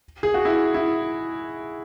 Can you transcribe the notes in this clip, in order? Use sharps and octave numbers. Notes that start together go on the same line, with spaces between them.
G#4
F#4
E4
E4